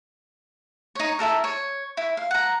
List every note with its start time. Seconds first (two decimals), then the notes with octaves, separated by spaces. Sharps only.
0.95 D#4 C#5
1.19 E4 F#4 A4 A#4
1.44 C#5
1.97 E4
2.17 F5
2.31 F#5 A#5